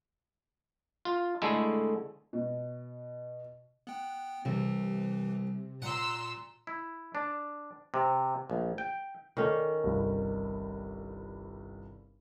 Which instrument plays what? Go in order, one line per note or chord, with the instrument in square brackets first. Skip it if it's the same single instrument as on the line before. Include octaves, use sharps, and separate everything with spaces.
[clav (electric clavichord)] F4
D3 G#3 A3 E4
[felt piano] B2
[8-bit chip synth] B3 G5 [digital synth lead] F#6
[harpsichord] C2 [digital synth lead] C3 [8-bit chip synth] E3
[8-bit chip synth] A#2 [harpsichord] F#5 [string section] A#5 C6 E6
[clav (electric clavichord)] E4
D4
C3
A#1
G5
[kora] D#3 C#4 [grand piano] A4 D5 E5
[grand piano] G1 C2